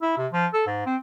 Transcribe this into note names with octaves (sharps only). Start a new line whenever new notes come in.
E4
C3
F3
A4
G#2
C4